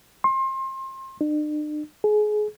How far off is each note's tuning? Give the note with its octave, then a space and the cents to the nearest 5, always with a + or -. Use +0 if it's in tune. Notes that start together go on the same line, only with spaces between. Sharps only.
C6 +30
D4 +45
G#4 +25